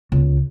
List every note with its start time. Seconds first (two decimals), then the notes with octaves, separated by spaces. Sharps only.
0.12 C#2